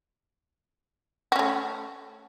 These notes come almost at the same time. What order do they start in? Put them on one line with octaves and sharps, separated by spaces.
F#4 C#4 A3